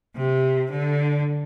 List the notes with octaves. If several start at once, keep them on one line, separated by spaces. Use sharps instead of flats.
C3
D3